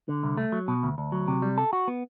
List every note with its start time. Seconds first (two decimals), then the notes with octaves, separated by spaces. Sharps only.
0.09 D3
0.23 C2
0.37 A3
0.52 F#3
0.68 B2
0.83 D2
0.98 D2
1.12 F#3
1.28 C3
1.42 G3
1.58 A4
1.73 F#4
1.88 B3